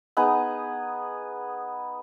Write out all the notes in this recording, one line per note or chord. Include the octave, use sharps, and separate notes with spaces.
B3 D#4 G#4